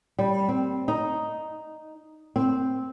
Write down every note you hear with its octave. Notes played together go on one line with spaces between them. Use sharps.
G3
C4
D#4
C4